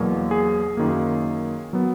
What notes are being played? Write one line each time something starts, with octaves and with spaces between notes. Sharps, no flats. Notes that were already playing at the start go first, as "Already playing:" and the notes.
Already playing: E2 B2 F#3 A#3
G#4
F#2 D#3 A#3
F#3 B3